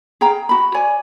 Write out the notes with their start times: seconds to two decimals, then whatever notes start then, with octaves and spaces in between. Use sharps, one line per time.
0.21 G#4 F5 G5 A#5
0.49 F#4 B5
0.74 C#5 D5 G#5